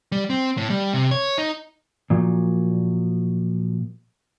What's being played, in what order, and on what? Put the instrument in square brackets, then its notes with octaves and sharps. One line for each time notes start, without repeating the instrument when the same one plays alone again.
[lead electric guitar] G3
C4
A2
G3
C3
C#5
D#4
[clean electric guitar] A#2 F3 F#3